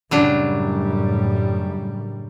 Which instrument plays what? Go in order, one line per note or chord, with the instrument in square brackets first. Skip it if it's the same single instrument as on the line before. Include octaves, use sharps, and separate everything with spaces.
[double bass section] F#2 A2 G3 [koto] C#3 F#3 D4